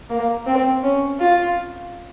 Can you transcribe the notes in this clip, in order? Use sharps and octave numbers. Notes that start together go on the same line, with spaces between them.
A#3
C4
C#4
F4